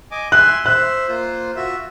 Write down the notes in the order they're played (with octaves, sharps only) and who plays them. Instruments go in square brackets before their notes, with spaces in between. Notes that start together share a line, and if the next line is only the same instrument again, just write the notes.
[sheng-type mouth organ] D#5 G#5 D6
[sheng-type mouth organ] E5 G#5 C6 [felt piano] F#6
[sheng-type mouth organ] C5 E5 [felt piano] F#6
[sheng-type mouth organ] A#3 F4 C5
F4 F#4 E5